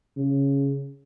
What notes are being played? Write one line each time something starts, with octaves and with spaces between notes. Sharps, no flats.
C#3